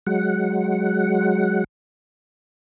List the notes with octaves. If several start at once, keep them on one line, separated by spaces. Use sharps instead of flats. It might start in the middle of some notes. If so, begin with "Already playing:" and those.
F#3 G#3 F#5